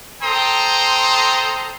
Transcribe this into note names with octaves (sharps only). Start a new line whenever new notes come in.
A4 C5 G5 A#5 C6 D#6